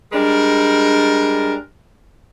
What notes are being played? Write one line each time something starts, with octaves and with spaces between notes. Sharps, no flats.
G3 G#3 D4 A#4